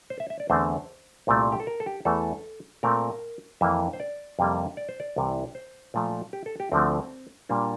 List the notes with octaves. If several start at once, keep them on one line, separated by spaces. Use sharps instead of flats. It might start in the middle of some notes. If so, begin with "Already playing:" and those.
C5
E5
E5
D5
E2 D3 A3 C4 C5
C2 A#2 A3 C4
G4
A4
A#4
A4
G4
E2 E3 A3 A4
A#2 A3 C4 A#4
F2 E3 A#3 E5
C5
D5
F2 C3 G3 A#3
D5
C5
D5
C2 C3 E3
C5
A#2 F3 A3
G4
A4
G4
D2 D3 F3 A3 C4
A#2 G3 A#3 D4